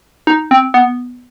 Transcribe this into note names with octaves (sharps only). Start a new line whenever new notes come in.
D#4
C4
B3